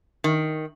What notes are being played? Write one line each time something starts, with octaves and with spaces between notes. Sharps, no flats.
D#3